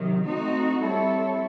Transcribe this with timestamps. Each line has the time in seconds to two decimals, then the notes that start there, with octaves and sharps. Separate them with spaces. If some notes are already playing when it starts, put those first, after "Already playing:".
Already playing: C3 D#3 F#3
0.26 A3 C4 D#4 F#4
0.81 G3 C4 E4 A4 C#5